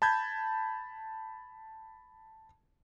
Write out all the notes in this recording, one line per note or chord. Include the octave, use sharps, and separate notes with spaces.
A5 B5 G6 G#6